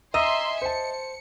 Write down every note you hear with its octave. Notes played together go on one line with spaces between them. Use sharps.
D#5 E5 G#5 A#5 C6 E6
C5 A5 C#7